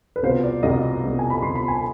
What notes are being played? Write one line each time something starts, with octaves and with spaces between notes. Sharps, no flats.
B4
C2 B2 B3 F4 C5
D5
C2 B2 B3 F4 D#5
C2 B2 B3 F4
G#5
B5
C2 B2 B3 F4 C6
B5
G#5